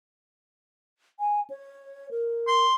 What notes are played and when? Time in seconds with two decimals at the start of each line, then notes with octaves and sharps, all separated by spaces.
1.20 G#5
1.50 C#5
2.11 A#4
2.47 C6